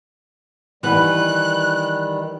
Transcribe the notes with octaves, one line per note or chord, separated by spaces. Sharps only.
D#3 E3 G3 B4 F#5 F#6